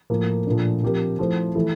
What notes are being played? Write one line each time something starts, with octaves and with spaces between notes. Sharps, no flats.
A2 F3 A#3
A#2 F3 A3 D4
F3 C4 G4 A#4
F3 A3 E4 A4 C5
E3 A3 E4 A4